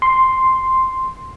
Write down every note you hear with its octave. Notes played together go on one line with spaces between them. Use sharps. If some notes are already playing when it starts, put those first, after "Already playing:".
C6